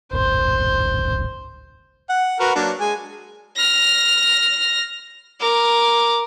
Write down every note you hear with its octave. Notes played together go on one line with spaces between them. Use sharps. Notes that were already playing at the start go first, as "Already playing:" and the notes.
D1 G#1 C5
F#5
F#4 A#4 B4
F#3 A#3 D4
G#3 G#5
F6 A#6
A#4 D6